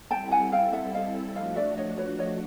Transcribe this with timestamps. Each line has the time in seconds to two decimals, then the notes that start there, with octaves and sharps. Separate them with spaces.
0.10 G3 C4 E4 A4 G5 A5
0.31 F#5 G#5
0.52 F5 G5
0.73 E5 F#5
0.94 D#5 F5
1.35 F3 A3 D4 F#4 D#5 F5
1.56 D5 E5
1.77 C#5 D#5
1.97 B4 C#5
2.19 C#5 D#5